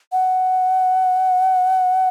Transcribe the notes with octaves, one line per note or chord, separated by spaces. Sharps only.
F#5